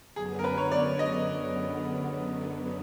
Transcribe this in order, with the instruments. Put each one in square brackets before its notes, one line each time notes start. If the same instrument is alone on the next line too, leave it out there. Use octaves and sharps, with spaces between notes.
[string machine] F#2 D3 F#3 B3 [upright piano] G#4
[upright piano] A#4
B4
C#5
D5
D#5